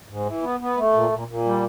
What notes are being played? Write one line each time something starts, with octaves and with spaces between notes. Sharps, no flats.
G#2
E3
B3
B3
A3
A#2
A#2
A#2
G3